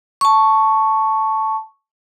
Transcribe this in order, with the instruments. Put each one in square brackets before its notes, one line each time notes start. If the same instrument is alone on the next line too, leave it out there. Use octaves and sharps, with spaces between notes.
[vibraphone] A5 C#6